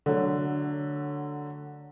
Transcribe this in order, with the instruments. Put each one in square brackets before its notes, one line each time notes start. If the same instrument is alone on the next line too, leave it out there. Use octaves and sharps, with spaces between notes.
[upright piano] D3 F#3 A3